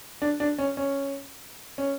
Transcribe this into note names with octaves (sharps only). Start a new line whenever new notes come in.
D4
D4
C#4
C#4
C#4